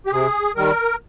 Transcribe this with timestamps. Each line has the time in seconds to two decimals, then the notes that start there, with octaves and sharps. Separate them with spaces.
0.06 G4
0.12 C3 G#4
0.56 D#3 G3 A#4